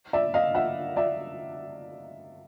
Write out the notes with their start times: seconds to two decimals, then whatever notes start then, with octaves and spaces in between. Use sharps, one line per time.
0.13 D5 E5
0.34 D#5 F5
0.55 E5 F#5
0.96 D5 E5